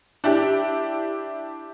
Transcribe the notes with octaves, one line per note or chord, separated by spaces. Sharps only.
D4 E4 G4